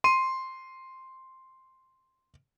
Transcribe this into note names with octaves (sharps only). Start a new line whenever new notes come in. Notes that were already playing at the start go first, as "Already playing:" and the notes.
C6 D#7